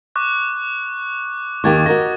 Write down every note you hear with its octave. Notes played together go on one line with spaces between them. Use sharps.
C#6 D6 F#6
D#2 D#3 G4 C#6 G#6 A6
F#4 A#4 D#5 A#6